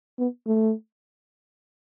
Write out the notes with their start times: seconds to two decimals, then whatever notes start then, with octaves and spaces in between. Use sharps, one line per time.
0.19 B3
0.47 A3